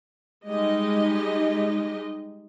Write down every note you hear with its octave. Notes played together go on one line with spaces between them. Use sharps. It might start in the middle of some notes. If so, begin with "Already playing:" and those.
G3 G#3 D#4 G4 D#5